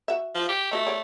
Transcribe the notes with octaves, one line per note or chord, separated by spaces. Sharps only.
F#4 E5
F3
G4
A3 F#4 D#5 E5
G4 C#5 D5